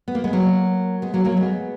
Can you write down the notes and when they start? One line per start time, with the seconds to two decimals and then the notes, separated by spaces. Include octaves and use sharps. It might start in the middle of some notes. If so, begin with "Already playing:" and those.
0.08 B3
0.15 A#3
0.24 G#3 B3
0.33 F#3 A#3
1.02 G#3 B3
1.14 F#3 A#3
1.25 F#3 A#3
1.37 G#3 B3